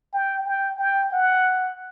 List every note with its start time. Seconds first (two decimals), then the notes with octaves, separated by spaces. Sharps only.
0.13 G5
0.45 G5
0.78 G5
1.12 F#5